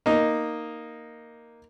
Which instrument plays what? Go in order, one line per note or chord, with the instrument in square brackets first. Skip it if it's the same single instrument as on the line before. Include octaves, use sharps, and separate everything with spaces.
[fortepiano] A#3 D#4